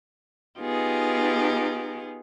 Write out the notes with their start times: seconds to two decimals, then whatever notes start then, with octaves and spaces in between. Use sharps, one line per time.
0.60 B3 D#4 F4 G4 G#4